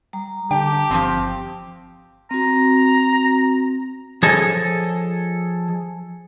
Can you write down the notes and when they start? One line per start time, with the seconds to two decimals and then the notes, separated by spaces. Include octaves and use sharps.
0.13 G3 A#5
0.51 D3 G4 G5 A5
0.91 G1 F3 G3 C4
2.31 C4 F#4 A#5
4.23 F3 G#4 A4 C#5 D#5